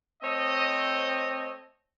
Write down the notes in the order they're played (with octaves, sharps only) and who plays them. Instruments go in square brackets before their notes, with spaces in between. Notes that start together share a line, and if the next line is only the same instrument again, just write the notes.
[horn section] A3 C4 C5 C#5 D#5